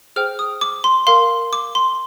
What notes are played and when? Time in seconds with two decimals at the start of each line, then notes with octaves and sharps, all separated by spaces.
0.16 G#4 C5 G5 F6
0.39 D#6
0.61 D6
0.84 C6
1.07 A#4 F5 C6
1.53 D6
1.75 C6